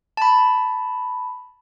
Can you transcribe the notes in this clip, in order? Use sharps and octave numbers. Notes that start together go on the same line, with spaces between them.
A5 B5